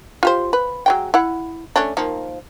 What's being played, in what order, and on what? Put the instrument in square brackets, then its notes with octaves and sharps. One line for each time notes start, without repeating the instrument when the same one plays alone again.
[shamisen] F4 G4 C5
B4
F#3 G#3 G5
E4 F#5
A3 C#4 D4
D#3 F3 A#3